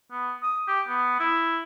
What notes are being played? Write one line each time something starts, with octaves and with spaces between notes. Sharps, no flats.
B3
D#6
G4
B3
E4